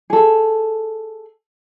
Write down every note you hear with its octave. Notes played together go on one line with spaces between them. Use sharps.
G#4 A4